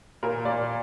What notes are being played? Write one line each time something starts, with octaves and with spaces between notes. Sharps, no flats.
A#2 A#4
A#2 D5